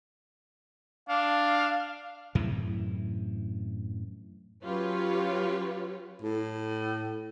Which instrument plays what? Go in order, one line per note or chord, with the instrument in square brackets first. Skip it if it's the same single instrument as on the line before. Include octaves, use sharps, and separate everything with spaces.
[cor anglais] D4 [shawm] F5
[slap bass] F#2 A2 C3 E3
[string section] F#3 C#4 F4 G4 B4 C#5
[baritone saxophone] A2